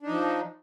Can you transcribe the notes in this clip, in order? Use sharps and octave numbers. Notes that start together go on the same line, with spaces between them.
F3 D4 D#4